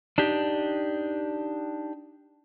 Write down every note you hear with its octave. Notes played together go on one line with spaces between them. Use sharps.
D4 D#4 G4